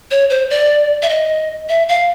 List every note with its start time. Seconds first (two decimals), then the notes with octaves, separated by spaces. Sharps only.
0.11 C#5
0.30 C5
0.50 D5
1.02 E5
1.09 D#5
1.69 E5
1.89 F5